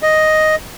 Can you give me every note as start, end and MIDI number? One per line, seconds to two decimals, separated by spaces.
0.03 0.55 75